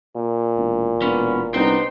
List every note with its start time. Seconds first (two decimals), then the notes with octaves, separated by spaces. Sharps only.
0.16 A#2
0.58 E1
1.02 E1 B3 C#4
1.54 C2 B3 D4 D#4 C5 G5